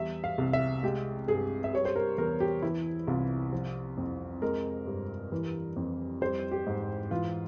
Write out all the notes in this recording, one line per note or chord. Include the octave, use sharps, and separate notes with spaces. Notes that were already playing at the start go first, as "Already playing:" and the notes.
Already playing: E2 G3 E5
F5
C2
E5
G#3 G4
G2 G#4
E5
G3 C#5
C5
A#4
E2 A#4
G4
E3 E4
C2 F4
F3
F2
G#3 A#4
G2
E3
F2
G3 C5
G4
G#2
E3 F4